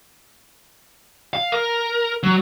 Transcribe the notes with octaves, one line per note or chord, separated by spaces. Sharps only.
F5
A#4
F#3